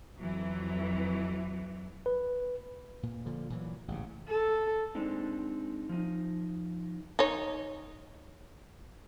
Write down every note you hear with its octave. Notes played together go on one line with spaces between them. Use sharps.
F2 E3 F#3
B4
A#2
A#2 D3 F3
A#2 E3 F#3
A1 G#2 C#3
A4
G#3 C4 D4 D#4
F3 D#4
D#4 C#5